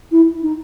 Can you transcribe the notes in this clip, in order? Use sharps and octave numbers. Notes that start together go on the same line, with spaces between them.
E4
D#4